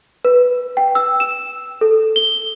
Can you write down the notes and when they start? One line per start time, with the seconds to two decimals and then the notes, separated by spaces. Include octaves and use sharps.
0.25 B4
0.77 G5
0.95 E6
1.20 E7
1.81 A4
2.16 G7